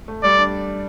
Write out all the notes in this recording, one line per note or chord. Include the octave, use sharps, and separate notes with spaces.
A3
G3 D5
D4